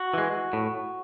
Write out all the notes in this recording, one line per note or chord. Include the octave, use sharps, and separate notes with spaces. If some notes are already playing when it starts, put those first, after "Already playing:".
Already playing: F#4
E3 G#3
A2